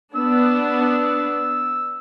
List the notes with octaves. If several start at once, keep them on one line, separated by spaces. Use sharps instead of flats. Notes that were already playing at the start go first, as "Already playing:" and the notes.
B3 D4 E6